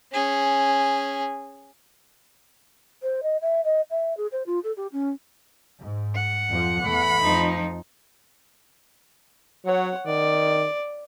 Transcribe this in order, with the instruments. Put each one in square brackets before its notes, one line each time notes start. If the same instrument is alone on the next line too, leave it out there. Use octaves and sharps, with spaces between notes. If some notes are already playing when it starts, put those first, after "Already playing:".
[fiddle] C#4 G#4
[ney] C5
D#5
E5
D#5
E5
G#4
C5
F4
A4
G4
C#4
[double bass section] G#2
[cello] F#5
[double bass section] F2 F3
[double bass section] E2 E3 A3 [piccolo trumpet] B5
[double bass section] F2 [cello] F3 D#4
[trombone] F#3 [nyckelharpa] C#5 F#5
[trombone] D#3 [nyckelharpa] D5